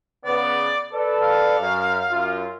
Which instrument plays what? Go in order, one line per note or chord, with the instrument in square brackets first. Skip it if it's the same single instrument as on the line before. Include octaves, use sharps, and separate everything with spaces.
[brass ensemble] C#3 B3 [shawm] D5
[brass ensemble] A4 B4 D5
[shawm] F5
[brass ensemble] F#2
F#2 F4